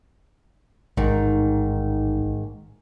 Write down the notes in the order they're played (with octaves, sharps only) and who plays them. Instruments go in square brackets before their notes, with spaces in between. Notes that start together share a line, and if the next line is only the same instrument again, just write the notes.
[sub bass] A1 [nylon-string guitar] G#2 D#3